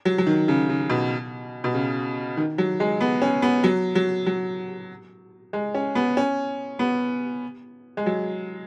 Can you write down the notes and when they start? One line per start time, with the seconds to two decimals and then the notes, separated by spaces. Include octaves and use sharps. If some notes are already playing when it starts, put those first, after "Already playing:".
0.05 F#3
0.18 F#3
0.27 D#3
0.48 C#3
0.69 C#3
0.90 B2
1.64 B2
1.74 C#3
2.37 D#3
2.58 F#3
2.80 G#3
3.01 B3
3.22 C#4
3.42 B3
3.64 F#3
3.95 F#3
4.26 F#3
5.53 G#3
5.75 C#4
5.95 B3
6.17 C#4
6.79 B3
7.97 G#3
8.06 F#3